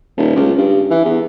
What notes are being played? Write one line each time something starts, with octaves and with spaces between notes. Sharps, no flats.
D#1
C#2
G2
E3
E2